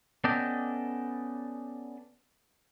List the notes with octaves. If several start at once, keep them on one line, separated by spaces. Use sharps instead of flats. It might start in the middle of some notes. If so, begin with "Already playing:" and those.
B3 C#4 A4 D5 D#5 G5